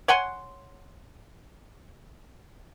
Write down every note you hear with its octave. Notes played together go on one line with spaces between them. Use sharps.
C#5 F#5 G#5 C6